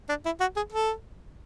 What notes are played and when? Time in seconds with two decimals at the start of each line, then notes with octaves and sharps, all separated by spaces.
0.09 D4
0.26 E4
0.40 F#4
0.56 G#4
0.72 A4